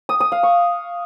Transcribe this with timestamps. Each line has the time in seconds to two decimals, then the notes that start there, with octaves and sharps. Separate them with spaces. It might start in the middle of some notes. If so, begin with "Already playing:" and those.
0.09 D#6
0.20 D#6
0.32 F5
0.43 C#6